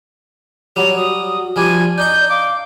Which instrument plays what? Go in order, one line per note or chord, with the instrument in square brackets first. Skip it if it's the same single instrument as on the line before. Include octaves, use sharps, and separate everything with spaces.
[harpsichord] F#3 G3 [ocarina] C#5 [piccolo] F7
[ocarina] F#4 [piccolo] D#6
[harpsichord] F3 G3 D4 [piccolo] G#5
[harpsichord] D4 D#4 C#6 [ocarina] D5 [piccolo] G6
[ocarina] F5 [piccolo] D6